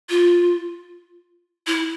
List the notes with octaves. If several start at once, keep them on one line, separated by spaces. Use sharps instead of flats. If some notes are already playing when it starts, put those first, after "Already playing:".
F4
E4